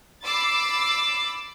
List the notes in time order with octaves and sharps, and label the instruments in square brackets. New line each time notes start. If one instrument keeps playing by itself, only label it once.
[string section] B5 D6 E6 A6 C7